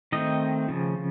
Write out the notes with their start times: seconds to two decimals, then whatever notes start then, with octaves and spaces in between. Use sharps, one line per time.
0.12 D#3 A3 C4 D#5
0.68 C#3 F3